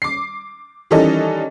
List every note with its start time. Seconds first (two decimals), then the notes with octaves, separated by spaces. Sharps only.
0.02 D6 C7
0.91 D#3 E3 G3 C#4 A4 D#5